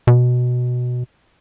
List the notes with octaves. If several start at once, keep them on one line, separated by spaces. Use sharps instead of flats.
B2